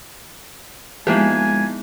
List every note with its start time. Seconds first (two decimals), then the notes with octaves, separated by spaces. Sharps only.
1.07 F3 G#3 A#3 B3 D#4 E4 G4 G#5